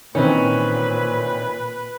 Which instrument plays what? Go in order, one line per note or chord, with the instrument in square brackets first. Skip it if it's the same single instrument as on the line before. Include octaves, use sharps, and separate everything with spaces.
[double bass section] A#2 [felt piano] D#3 E3 C4 [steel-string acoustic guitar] C#4 [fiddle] B4